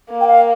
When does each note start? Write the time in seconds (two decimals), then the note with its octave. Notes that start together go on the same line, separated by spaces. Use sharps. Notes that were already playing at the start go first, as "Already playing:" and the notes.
0.10 A#3
0.21 G5
0.28 F5